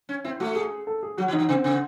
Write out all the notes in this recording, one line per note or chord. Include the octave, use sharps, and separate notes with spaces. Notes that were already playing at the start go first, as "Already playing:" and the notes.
C#4
C4 E4
A3 F#4
G#4
A4
G#4
F#3 F#4
E3
D#4
E3
C#3 C4
C#3